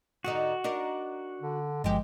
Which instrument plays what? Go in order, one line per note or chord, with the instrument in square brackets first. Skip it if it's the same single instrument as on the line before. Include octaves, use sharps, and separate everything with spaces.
[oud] G#2 D3 D#4 [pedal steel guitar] F#4
[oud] D4 D#4 A#4
[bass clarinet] D3
[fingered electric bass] G1 F3 [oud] G2 G4 [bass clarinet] G#3